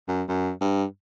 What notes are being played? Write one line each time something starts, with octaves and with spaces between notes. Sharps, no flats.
F#2
F#2
G2